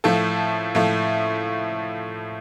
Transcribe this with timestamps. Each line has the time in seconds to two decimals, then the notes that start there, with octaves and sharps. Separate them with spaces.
0.04 A2 F3 A3 A4
0.75 A2 F3 A3